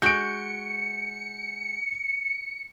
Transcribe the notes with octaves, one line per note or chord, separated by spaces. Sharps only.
G#3 F#4 G6 C#7 D7